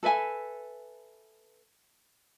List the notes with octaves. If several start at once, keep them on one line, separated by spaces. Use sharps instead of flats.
A4 B4 E5 G#5